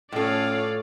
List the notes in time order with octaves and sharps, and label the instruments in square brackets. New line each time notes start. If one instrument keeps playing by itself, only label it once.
[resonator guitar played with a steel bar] A2 A4 [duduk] C#4 [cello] F4 C#5 [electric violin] D5 F5